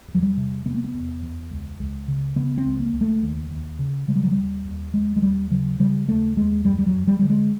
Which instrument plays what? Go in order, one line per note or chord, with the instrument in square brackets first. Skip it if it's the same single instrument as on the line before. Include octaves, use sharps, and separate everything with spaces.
[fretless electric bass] E2
F#3
G3
C3
C3 B3
A#3
B3
E2
E2
C#2
C#2
C#3
C#3 B3
C4
C#2
A#3
C#2
A3
D#2
D#2
C#3
C#3 G#3
G3
F#3
D#2 G3
D#2
D#2 G#3
G#3
D#2 G3
C#3 F#3
C#3 G3
D#2 A3
D#2 G#3
F#2 G3
G3
F#3
F#2
G3
D3 G3
G#3